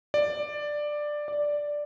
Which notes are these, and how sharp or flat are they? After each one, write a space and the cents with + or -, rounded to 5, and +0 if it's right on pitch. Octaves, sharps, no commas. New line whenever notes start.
D5 +10
D5 +0